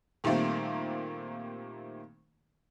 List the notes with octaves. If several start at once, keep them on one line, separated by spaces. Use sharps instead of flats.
A#2 D#3 G3 A3 A#3 C4